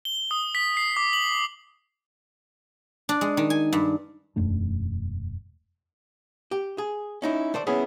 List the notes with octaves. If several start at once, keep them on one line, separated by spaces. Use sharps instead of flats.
G7
D#6
B6
C7
D6
F#7
D4
G#3
D#3
G#5
G2
E1 F#2 A3 D4
G4
G#4
C#4 D#4 E4
A3 C5 D5
B3 C#4 E4 G#4